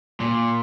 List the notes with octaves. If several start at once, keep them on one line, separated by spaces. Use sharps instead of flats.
A#2